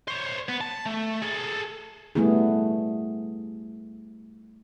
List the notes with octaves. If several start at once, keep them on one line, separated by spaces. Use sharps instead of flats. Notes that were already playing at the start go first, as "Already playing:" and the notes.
C5 C#5
B3
A5
A3
G#4 A4
G3 A3 B3 E4 G#4